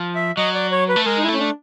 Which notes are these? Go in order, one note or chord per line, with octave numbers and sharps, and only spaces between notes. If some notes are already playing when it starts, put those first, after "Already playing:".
Already playing: F3
E5
F#3 D#5
D5
C#5
B4
A3
G#3 A#4
D#4
E4
A3 C#4
D4